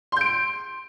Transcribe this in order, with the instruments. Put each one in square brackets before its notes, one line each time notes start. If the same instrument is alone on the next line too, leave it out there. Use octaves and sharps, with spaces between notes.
[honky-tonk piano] C6
G6
D7